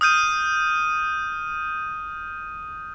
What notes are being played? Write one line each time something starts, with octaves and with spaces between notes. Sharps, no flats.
D#6 F6 G6 D#7